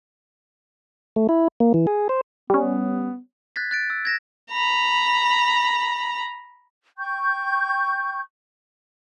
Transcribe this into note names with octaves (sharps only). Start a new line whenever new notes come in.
A3
E4
A#3
E3
G#4
C5
G3 B3 C#4
F#6 G#6 A6 B6
F#6 A6 D7
E6
G#6 A#6 E7
A#5 B5
G5 C#6 G6